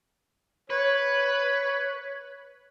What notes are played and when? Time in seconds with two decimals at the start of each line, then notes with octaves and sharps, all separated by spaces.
0.70 B4 C#5